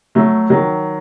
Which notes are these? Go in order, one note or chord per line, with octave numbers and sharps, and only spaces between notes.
F#3 A3
D#3 F#3